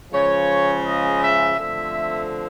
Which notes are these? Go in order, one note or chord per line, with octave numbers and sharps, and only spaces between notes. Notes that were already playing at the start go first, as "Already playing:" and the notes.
C#3 F3 G#3 C#5
D#5
E5
D3 F3 A3 C4 E5